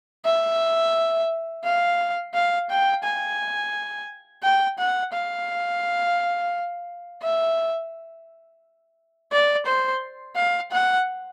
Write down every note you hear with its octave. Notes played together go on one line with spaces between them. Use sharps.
E5
F5
F5
G5
G#5
G5
F#5
F5
E5
D5
C5
F5
F#5